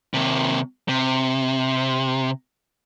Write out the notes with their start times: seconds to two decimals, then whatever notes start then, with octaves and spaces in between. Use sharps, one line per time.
0.14 D#2 C3
0.89 C3